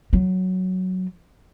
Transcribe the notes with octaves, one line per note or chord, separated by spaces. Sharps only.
F#3